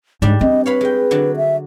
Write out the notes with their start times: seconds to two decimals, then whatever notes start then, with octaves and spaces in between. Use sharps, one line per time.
0.22 G#2 G3 G#3 D4 D5
0.41 C4 D#5
0.66 B4 C#5 F5 B5
0.81 G#3 G5
1.11 D3 F#3
1.37 E5